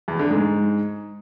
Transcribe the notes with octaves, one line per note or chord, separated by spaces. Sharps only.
E2
D3
G#2